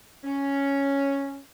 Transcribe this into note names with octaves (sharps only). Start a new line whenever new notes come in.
C#4